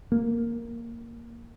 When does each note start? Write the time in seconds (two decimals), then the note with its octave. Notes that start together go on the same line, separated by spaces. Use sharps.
0.12 A#3